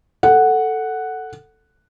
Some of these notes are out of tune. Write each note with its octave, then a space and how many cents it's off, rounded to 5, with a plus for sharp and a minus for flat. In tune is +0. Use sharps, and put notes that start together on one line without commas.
A4 +5 F#5 +0